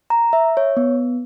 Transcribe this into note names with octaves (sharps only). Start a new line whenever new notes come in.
A#5
E5
C#5
B3